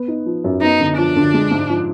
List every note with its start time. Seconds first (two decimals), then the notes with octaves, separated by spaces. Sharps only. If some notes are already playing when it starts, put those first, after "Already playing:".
Already playing: B3
0.08 D#4
0.26 F3
0.44 F#2
0.62 B3 D#4
0.80 D3
0.98 F3 D4
1.16 D3
1.34 G#3
1.51 G#2
1.70 F3